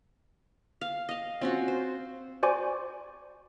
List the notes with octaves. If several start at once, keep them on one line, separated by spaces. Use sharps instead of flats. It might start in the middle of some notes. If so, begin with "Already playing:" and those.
F5
D#5 F5
C4 C#4 F4 F#4
C5
F#4 C5 D5 G#5 C#6 D6